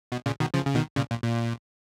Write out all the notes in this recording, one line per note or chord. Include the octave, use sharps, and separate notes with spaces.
B2
A#2 C#3
B2 D#3
C#3 F3
C#3
B2 D#3
A#2 C#3
A#2
A#2